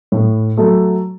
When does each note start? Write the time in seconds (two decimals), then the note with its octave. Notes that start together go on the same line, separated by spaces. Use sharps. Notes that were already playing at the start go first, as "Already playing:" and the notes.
0.12 A2
0.57 F#3 A3 F#4 A4